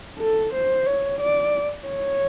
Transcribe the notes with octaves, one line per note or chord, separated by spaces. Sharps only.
A4
C5
C#5
D5
C#5